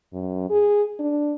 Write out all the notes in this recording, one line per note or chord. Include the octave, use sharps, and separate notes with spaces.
F#2
G#4
D4